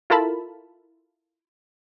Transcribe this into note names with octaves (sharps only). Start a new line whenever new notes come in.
E4 F4 A4 A#4 A5 B5